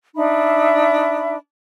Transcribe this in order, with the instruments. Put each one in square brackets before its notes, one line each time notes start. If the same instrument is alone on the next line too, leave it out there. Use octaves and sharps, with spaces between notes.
[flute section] D4 D#4 E5 B5